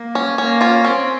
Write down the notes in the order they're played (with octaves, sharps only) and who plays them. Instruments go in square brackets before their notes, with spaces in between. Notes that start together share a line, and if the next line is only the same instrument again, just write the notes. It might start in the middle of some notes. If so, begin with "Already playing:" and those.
Already playing: [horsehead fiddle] A#3
[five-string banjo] C#4
[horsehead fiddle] A#3 [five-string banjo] C#4
[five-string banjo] C#4 F4
[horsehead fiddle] C4 [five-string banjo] C#4